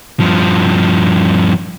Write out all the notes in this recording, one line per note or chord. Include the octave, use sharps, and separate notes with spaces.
G2 F3